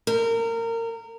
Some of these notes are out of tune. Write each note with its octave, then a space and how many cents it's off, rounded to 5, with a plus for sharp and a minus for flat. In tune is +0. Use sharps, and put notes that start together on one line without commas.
A#4 -25